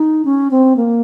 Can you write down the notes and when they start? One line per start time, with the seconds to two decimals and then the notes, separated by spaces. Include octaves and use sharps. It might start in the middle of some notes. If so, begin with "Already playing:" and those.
Already playing: D#4
0.25 C#4
0.51 C4
0.76 A#3